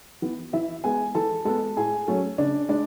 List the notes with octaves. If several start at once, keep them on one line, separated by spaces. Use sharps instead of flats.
E3 B3
E3 E4 E5
G#3 B3 G#4 G#5
E3 A4 A5
G#3 B3 A4 A5
A2 G#4 G#5
F#3 A3 C#4
C#3 D4 D5
G#3 D4 D5